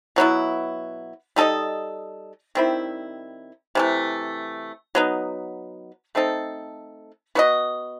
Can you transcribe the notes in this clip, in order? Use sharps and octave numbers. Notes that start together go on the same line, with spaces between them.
B2 F#3 B3 E4
G3 D#4 A4 D#5
D#3 G3 C4 E4
C3 E3 A3
F#3 B3 D#4
A3 C4 D#4 A4
B3 F#4 B4 D#5